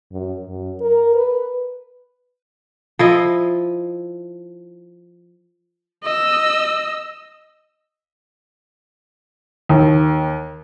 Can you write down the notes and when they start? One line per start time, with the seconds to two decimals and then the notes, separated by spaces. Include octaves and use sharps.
0.13 F#2
0.47 F#2
0.81 A#4
1.15 B4
2.99 F3 E4 D#5
6.04 D#5 E6
9.69 D#2